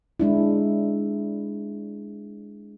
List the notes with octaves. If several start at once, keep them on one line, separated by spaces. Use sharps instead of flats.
G#3 D4 E4